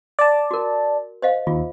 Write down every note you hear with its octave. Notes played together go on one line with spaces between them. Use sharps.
D5 A5
F#4 A#4
C5 D#5 F5
D#2 F4